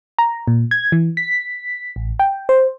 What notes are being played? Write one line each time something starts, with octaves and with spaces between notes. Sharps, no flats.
A#5
A#2
G#6
E3
B6
A1
G5
C5